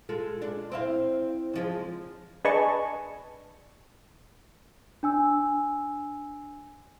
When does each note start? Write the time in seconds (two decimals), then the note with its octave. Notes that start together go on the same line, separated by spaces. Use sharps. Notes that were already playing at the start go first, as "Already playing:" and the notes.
0.09 G#3 F4 A4
0.42 D4
0.72 C4 E4 F5
1.53 C#3 F3 G#3
2.44 D4 G#4 B4 D#5 A5 C#6
5.03 D4 G#5 E6